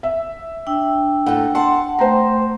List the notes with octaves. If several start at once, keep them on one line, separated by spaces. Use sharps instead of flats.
E5
D4 G5 E6
A2 A4 F#5
F#5 A5 C6
A3 C5 G5 A#5 C6